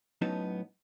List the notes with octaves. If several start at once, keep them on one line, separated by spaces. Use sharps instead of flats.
A2 F#3 B3 C#4 D#4 A5